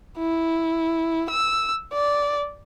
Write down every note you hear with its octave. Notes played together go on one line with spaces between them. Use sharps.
E4
E6
D5